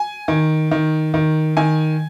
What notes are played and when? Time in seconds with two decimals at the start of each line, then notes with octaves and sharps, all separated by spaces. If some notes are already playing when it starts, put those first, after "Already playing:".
Already playing: G#5
0.28 D#3
0.71 D#3
1.14 D#3
1.57 D#3 G#5